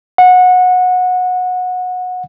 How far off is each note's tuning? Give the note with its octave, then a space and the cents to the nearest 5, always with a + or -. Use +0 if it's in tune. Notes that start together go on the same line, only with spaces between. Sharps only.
F#5 -20